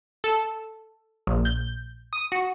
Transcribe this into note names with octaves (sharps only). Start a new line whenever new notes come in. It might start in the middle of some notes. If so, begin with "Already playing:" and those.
A4
A#1
G6
D#6
F#4